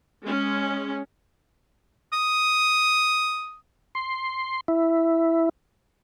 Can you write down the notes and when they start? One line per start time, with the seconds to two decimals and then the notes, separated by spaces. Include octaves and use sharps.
0.24 G#3 C#4
2.13 D#6
3.95 C6
4.68 E4